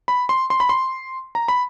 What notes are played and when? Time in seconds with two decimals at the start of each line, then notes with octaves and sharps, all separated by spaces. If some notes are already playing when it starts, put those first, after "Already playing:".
0.08 B5
0.29 C6
0.50 C6
0.60 B5
0.69 C6
1.35 A#5
1.48 B5